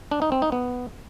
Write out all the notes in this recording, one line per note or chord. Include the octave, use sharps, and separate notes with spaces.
D4
D#4
C4
D#4
B3